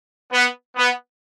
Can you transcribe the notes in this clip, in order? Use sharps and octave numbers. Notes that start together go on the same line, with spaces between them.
B3
B3